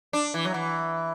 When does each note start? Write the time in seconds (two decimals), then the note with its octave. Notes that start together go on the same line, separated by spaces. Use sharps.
0.13 D4
0.34 E3
0.45 F#3
0.54 E3